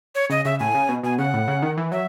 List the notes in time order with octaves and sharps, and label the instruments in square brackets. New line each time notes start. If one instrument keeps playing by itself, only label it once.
[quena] C#5
[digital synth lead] C#3 [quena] D#5
[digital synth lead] C#3 [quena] E5
[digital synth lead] A2 [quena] G#5
[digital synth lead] C#3
B2
[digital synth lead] B2 [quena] G#5
[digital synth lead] C#3 [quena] F#5
[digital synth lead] A2
C#3
D#3
E3
[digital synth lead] F#3 [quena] E5